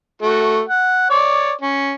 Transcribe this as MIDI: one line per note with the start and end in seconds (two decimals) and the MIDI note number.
0.22 0.61 57
0.22 0.61 66
0.69 1.05 78
1.10 1.52 73
1.10 1.52 74
1.61 1.94 61